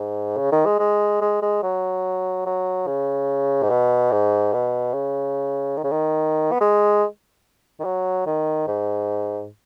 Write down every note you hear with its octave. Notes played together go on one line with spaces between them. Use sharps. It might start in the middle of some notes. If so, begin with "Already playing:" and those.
Already playing: G#2
C#3
D#3
G#3
G#3
G#3
G#3
F#3
F#3
C#3
G#2
B2
G#2
B2
C#3
D#3
C#3
D#3
B3
G#3
D#3
F#3
D#3
G#2